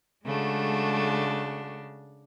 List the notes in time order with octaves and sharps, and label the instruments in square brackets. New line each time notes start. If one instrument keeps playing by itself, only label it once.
[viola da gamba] C#3 D4 [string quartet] G#3 A3 F#4